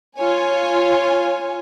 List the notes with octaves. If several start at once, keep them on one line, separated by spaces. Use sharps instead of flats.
F4 C#5 G#5